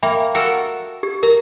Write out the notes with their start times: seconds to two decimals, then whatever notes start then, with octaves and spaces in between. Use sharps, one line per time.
0.03 A#3 E5 G5 B5
0.35 F#4 A4 A#4 F#5 E6
1.03 G4
1.23 A#4 A#5